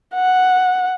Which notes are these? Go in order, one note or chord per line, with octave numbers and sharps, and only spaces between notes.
F#5